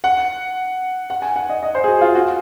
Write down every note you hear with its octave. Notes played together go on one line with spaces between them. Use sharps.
F#5
F#5
G#5
F#5
D#5
D#5
C5
G#4
F#4
F4
F#4